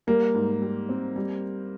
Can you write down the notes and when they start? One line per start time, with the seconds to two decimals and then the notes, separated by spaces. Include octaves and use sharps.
0.07 G3 A#3
0.34 G#2
0.62 G3
0.89 C4
1.16 G3